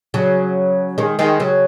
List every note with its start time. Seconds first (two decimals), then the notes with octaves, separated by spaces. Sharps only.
0.14 C#3 F#3
0.98 D#3 G#3
1.19 D#3 G#3
1.40 C#3 F#3